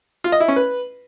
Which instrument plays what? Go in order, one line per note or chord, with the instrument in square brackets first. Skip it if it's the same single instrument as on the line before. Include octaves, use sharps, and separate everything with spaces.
[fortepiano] F4
D#5
E4
C#4
B4